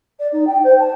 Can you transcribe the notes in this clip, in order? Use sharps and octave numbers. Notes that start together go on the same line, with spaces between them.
D5
D#4
G5
C5
A5